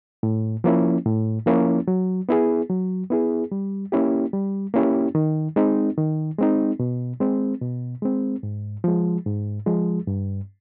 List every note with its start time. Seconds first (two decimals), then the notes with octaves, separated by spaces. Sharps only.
0.23 A2
0.64 F3 A#3 C#4 E4
1.05 A2
1.46 F3 A#3 C#4 E4
1.88 F#3
2.29 B3 E4 G#4
2.70 F#3
3.10 B3 E4 G#4
3.52 G3
3.92 A#3 C#4 E4 G4
4.33 G3
4.74 A#3 C#4 E4 G4
5.15 D#3
5.56 G#3 C4 D#4
5.97 D#3
6.39 G#3 C4 D#4
6.80 B2
7.20 G#3 C4
7.61 B2
8.02 G#3 C4
8.43 G#2
8.84 F3 G#3
9.26 G#2
9.66 F3 G#3
10.07 G2